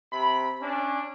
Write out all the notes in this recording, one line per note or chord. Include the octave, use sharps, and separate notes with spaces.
C3 B5
C#4 D4